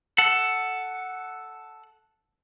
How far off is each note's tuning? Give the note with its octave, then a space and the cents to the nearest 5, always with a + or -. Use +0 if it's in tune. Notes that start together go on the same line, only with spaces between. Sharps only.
A4 +0 F#5 +0